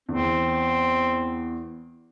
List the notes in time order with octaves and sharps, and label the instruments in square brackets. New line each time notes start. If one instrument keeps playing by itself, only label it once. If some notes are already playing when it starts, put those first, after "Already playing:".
[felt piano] E2 [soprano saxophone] C4